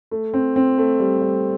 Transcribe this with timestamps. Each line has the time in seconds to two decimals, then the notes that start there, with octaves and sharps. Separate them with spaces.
0.11 A3
0.34 C4
0.56 C4
0.78 A3
1.00 G3
1.22 G3